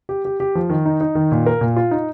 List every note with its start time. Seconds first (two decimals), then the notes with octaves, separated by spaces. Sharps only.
0.09 G4
0.25 G4
0.40 G4
0.55 F3
0.70 D#3
0.85 D#4
1.01 D#4
1.15 D#3
1.32 A#2
1.46 A#4
1.61 A#2
1.76 F4
1.91 D#4